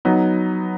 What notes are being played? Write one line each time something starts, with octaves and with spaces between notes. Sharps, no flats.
F#3 B3 D#4